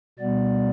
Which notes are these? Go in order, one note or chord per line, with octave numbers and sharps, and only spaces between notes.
B2 G3 B3 D5